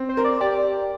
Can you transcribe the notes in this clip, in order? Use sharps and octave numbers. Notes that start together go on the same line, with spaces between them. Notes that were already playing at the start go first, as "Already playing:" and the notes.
Already playing: C4
C5
A#4
D5
G4 D5